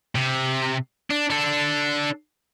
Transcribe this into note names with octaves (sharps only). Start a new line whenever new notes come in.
C3
D4
D4 A4